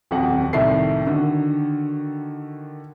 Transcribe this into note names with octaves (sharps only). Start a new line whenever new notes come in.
D#1 F2 F#3 F#5
C2 A2 C3 D#3 A3 C7
D3 D#3 F#4